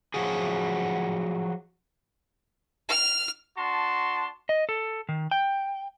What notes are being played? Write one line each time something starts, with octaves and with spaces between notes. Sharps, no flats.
F3 F#3 F#4 G#4
F6
D4 F#4 A5 C6
D#5
A4
D#3
G5